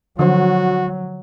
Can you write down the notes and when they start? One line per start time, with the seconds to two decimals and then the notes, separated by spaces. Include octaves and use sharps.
0.19 D3 F3 F#3 F#4 C5